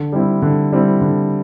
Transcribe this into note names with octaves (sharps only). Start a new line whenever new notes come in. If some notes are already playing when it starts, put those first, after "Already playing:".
Already playing: D3
G3 C4 E4
D3
G3 C4 E4
D3